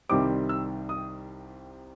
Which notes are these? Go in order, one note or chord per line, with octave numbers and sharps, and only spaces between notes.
C2 C3 D#3 G3 C4 D6
E6
D#6